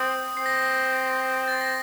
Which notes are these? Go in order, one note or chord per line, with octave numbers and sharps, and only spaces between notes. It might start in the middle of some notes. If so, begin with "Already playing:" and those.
Already playing: C4 D#6
C4 C7
A#6
C7
C7
A6
A#6